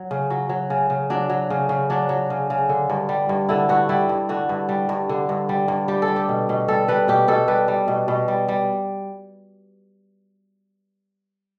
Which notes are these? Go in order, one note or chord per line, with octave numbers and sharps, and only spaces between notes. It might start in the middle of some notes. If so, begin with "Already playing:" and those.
Already playing: F#3
C#3
F#3
F#3
C#3
C#3
F#3 D4
F#3
C#3
C#3
F#3 D4
F#3
C#3
C#3
D3
G2
G3
G2
D3 E4
G2 F#4
G3 E4
G2
D3 F#4
G2
G3
G2
D3
G2
G3
G2
G3 G4
A4
G3
G4
B2
B2
G3 A4
G3 B4
B2 G4
B2 A4
G3 B4
G3
B2
B2
G3
G3